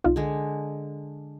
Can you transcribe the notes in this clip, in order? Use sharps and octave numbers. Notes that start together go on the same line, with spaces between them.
C2 D#4 F4
D3 G#3